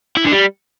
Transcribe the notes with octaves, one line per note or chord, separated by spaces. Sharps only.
E4
D3
G3